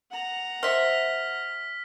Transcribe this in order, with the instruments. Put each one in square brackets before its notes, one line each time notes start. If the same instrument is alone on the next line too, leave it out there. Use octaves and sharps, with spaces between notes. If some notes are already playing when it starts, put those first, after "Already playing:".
[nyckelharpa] F#5 A#5
[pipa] C5 E5 [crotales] F6 B6